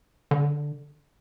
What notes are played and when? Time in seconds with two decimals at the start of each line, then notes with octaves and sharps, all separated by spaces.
0.31 D3